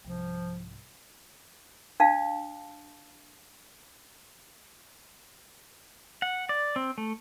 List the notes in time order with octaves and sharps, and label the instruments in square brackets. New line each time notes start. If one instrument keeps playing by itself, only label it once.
[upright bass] C2 G#2 [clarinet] F3
[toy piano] D4 F5 A5
[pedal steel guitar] F#5
D5
C4
A3